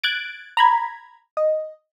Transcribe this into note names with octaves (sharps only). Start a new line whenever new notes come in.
F#6 G#6 A6 D7
A#5 B5 G#6
D#5